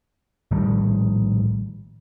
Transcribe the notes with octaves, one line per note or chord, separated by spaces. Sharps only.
A#1 A2 D#3 G3